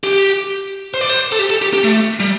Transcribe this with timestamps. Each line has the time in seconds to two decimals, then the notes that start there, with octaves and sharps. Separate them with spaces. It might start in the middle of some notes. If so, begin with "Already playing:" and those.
0.04 G4
0.94 C5
1.01 D5
1.09 C5
1.32 A4
1.39 G4
1.50 A4
1.62 G4
1.74 G4
1.84 A3
2.20 G3